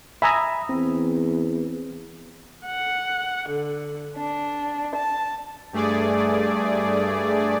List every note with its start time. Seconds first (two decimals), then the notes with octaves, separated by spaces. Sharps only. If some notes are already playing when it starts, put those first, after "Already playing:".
0.22 E5 G#5 A#5 B5 D#6
0.69 E2 C4
2.64 F#5
3.48 D3
4.16 D4
4.94 A5
5.73 G2 A3 G#4 D5